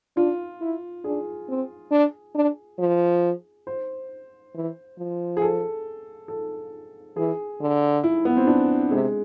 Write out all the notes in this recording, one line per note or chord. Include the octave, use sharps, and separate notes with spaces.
D4 F4
E4
D4 G#4
C4
D4
D4
F3
C5
E3
F3
G#4
A4
A4
E3 G#4
D3
E4
B3
C4
D4
C3 G#3